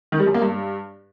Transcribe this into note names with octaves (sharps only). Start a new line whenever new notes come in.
D#3
G3
F#2
A#3
G2